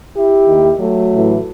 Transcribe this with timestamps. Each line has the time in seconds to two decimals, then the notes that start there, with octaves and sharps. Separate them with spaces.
0.14 E4 G4
0.47 D#2 D#3
0.80 F#3 A3
1.13 A1 A2 E3